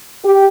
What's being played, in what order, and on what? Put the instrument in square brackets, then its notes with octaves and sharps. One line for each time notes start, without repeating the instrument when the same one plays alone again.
[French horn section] G4